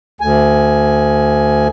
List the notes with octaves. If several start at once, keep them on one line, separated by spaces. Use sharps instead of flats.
D2 G#5